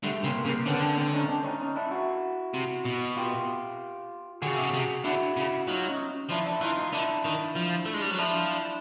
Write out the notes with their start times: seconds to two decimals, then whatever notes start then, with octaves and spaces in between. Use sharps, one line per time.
0.03 D3 G3 A3
0.24 C#3 A#3 C4
0.45 C#3 A#3 C4
0.66 D3 B3 C#4
0.82 C4 D4
0.97 C4 D4
1.13 C#4 D#4
1.29 C4 D4
1.44 C#4 D#4
1.60 C#4 D#4
1.75 D4 E4
1.91 E4 F#4
2.54 C3
2.86 B2
3.17 F4 G4
4.42 D3 F#4 G#4
4.49 C#3
4.57 C3
4.64 C#3
4.74 C3
5.05 D3 E4 F#4
5.37 C#3
5.68 F#3 D#4 F4
5.89 C#4 D#4
6.30 F3 D4 E4
6.46 D4 E4
6.61 E3 D#4 F4
6.77 D#4 F4
6.93 D3 D4 E4
7.25 D#3
7.56 F3
7.86 A3
7.94 G#3
8.02 G3
8.11 F#3
8.18 F3 D4 E4